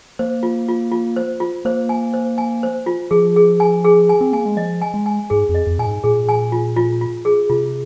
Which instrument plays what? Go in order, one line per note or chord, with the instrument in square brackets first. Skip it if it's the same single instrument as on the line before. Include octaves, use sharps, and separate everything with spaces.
[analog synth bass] A#3 [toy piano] C5
[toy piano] F4
F4
F4
C5
F4
[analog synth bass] A#3 [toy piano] C5
[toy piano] G#5
C5
G#5
C5
F4
[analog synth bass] F3 [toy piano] G#4
[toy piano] G#4
G#5
G#4
G#5
[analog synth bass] C4
[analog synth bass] A#3 [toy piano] G#5
[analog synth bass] G#3
[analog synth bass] F3 [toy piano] D#5
[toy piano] G#5
[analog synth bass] G#3
[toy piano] G#5
[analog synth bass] G#2 [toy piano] G#4
[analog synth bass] F2
[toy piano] D#5
[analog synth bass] F2
[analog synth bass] A#2 [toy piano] G#5
[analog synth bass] G#2
[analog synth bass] A#2 [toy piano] G#4
[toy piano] G#5
F4
F4
F4
G#4
[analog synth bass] C3 [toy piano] F4